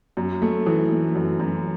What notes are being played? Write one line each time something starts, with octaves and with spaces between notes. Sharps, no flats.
F#2
A3
E3
A3
F#2
F#2